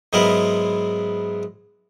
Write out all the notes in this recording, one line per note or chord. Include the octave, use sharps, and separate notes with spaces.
G#2 F#3 G#3 B3 E4 A#4